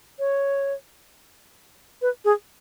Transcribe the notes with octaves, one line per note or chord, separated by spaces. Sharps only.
C#5
B4
G#4